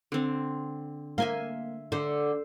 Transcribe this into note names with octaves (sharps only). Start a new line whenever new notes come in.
D3 C4
A#3 E5 G#5 C6
D3 C5